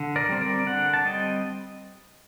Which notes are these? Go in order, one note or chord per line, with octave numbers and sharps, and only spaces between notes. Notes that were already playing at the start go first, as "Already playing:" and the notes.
Already playing: D3
A#4 D5
G3 C4
A#4 D5
D3 D5 F#5
A5
G3 C4 D#5 G5